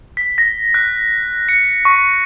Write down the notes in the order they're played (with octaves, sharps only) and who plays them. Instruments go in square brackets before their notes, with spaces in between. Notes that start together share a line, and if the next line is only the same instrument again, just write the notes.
[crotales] B6
A#6
F#6
C#7
C#6